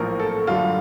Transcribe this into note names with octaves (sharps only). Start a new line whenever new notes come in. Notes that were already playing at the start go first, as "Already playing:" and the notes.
Already playing: A#1 A2 F3 A#4
A4
F#2 D3 G3 F4